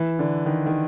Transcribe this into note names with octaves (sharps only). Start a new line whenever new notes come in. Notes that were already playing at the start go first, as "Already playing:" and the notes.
Already playing: E3
D3
D#3
D#3